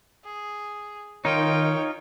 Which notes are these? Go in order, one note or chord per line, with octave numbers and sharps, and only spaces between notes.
G#4
D#3 D#4 F4 C#5 G5